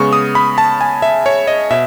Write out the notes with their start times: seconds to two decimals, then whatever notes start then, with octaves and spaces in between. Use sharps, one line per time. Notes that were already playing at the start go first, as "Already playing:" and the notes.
Already playing: C#3 G#3 B3 C#6
0.13 D#6
0.35 B5
0.58 A5
0.81 G#5
1.02 E5
1.26 C#5
1.47 D#5
1.71 B2 E5